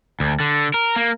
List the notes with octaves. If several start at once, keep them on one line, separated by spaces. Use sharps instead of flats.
D2
D3
A#4
A#3